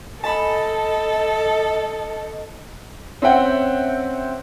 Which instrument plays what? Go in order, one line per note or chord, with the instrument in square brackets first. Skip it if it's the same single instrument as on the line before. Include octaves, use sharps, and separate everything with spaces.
[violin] A4 [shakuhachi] D#5 [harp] A5 B5
[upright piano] C4 C#4 E5 F#5 G5